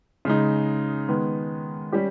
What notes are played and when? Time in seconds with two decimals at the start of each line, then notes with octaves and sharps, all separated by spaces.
0.25 C#3 G#3 D#4
1.08 D#3 G#3 B3
1.92 G3 C#4 G4